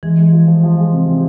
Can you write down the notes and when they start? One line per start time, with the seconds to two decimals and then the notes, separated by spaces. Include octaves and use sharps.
0.03 E3 G#3
0.18 G#3
0.32 F3
0.47 F3
0.63 F3
0.78 G#3
0.92 C3
1.08 C3